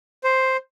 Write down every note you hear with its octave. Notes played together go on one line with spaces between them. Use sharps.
C5